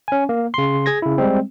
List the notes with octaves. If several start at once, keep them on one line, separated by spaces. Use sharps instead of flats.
C#4 G#5
A#3
C#3 C6
G#4 G#6 A#6
C#3 E4
G3 G#3 C4